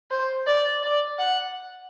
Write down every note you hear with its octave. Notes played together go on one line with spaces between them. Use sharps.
C5
D5
D5
F#5